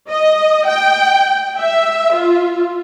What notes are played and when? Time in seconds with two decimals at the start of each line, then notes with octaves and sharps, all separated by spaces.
0.10 D#5
0.66 G5
1.58 E5
2.15 F4